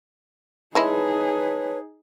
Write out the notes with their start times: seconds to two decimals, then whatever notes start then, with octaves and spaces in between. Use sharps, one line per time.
0.75 E3 G#3 D#4 E4 G#4 B4 C#5 A5